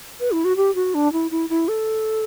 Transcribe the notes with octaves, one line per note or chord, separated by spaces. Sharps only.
B4
E4
F#4
G4
F#4
D4
E4
E4
E4
A4